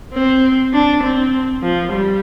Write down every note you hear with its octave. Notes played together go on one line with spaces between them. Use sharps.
C4
D4
C4
F3
G3